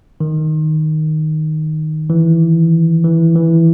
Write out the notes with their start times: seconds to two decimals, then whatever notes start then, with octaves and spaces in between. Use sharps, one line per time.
0.20 D#3
2.10 E3
3.04 E3
3.36 E3